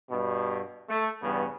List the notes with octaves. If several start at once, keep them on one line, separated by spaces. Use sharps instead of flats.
G2 B2
A3
E2 G2 C#3 B3